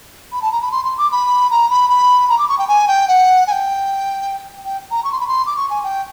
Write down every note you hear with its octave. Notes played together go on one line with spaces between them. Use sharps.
B5
A5
A#5
B5
C6
C6
D6
B5
A#5
B5
B5
A#5
D6
C#6
G5
G#5
G5
F#5
G#5
G5
G5
A#5
C#6
C6
B5
C6
D6
C#6
G#5
G5